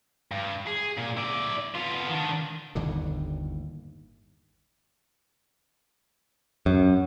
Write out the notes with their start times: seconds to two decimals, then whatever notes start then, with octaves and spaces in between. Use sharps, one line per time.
0.32 G2
0.67 G#4
0.98 A#2
1.17 E4 D5
1.74 B3 F4
2.09 D#3 D4
2.75 G1 D#2 A2 D3
6.66 F#2